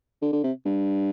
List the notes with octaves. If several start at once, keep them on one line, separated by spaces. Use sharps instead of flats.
D3
D3
C3
G2